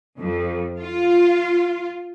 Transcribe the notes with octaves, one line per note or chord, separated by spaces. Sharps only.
F2
F4